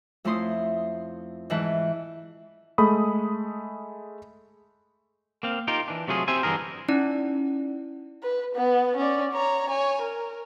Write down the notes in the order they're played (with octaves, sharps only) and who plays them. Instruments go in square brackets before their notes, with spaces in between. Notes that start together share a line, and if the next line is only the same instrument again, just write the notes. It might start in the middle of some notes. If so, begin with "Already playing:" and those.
[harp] F2 A3 C#4 E4 C6 D#6
G#2 E3 B4 A5
[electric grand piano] G#3 A3 B5 D#6
[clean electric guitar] A#3 C4 F5
D#4 F4 G4 A#4
E3 D4
C3 F#3 A3 F4 G#4
C4 G4 C5 E5 G#5
G2 D3 E3 G#4 A#4
[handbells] C#4 D#4 E4 D5
[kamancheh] B4
B3
C#4 D5
C#5 A#5
C#5 G#5
A#4